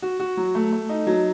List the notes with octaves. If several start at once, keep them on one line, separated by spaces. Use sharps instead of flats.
F#4
F#4
F#3
A3
A3
D#4
F#3